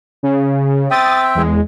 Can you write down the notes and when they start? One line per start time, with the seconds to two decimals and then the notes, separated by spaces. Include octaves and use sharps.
0.23 C#3
0.91 C4 E5 G5 D#6 A6
1.35 E2 G#3